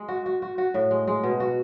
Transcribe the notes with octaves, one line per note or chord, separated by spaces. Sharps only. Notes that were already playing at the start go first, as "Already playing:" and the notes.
Already playing: G#3
F#4
F#4
F#4
F#4
A2
G#3
G#3
B2
F#4